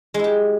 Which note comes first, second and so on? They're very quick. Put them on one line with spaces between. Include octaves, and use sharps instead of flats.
G#3 E4 G4